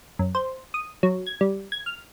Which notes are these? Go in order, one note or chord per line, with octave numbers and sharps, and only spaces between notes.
F#2
C5
D#6
F#3
G#6
G3
G#6
F6